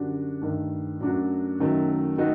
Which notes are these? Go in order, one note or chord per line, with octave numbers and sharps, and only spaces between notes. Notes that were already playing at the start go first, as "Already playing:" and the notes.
Already playing: F#2 D3 G3 D4 F#4
G2 D#3 A3
F#2 F#3 A3 D4 F#4
F#2 D#3 F#3 A3
D#3 A3 D#4 F#4